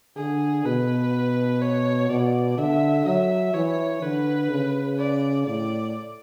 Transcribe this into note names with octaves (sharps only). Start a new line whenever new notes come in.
D3 G#4
B2 B4
C#5
B2 D5
D3 E5
F#3 E5
E3 C#5
D3 B4
C#3
D5
A2 D5